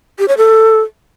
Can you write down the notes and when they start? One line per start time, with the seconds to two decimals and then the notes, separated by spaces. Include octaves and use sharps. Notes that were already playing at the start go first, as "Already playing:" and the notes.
0.19 G4
0.28 C#5
0.37 A4